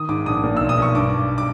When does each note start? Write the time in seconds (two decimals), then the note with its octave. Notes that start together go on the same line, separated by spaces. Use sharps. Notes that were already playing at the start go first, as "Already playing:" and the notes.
Already playing: D#3 D#6
0.09 G#2 D6
0.26 A#1 D#6
0.44 A#2
0.57 B1 E6
0.69 D#6
0.78 B1 C#6
0.95 G2 D6
1.12 G2
1.38 D6